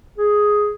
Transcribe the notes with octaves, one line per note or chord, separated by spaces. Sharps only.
G#4